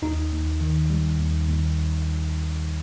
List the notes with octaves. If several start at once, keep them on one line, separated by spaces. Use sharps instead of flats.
D#2 D#4
D#2
D#3
G3
D#2
D#2